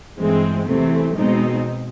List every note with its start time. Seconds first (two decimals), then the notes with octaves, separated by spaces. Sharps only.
0.17 G2 E3 G#3 C4
0.67 E2 C3 E3 A3 C4
1.16 B2 G#3 C4 D#4